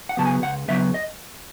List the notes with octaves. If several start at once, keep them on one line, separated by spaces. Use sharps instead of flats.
F#5
C#3 F#3 B3 A5
G#5
C#2 F#5
C#3 F#3 B3 E5
D#5